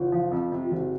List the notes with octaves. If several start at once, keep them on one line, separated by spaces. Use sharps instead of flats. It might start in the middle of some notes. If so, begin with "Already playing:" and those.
Already playing: F#1 F4
F3
F2
C3
F4
F#1 F#4